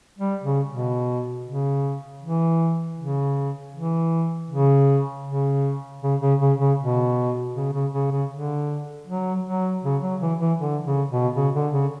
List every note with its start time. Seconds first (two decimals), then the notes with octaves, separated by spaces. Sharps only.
0.19 G3
0.43 C#3
0.69 B2
1.46 C#3
2.22 E3
2.98 C#3
3.74 E3
4.50 C#3
5.26 C#3
6.02 C#3
6.21 C#3
6.41 C#3
6.60 C#3
6.79 B2
7.55 C#3
7.73 C#3
7.93 C#3
8.11 C#3
8.31 D3
9.07 F#3
9.46 F#3
9.84 C#3
10.02 F#3
10.20 E3
10.40 E3
10.59 D3
10.84 C#3
11.10 B2
11.35 C#3
11.54 D3
11.73 C#3